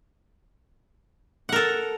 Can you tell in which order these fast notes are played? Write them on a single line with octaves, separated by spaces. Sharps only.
F#5 A#4 A4